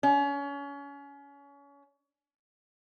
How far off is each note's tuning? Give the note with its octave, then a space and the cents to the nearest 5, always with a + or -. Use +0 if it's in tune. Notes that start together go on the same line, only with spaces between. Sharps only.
C#4 +30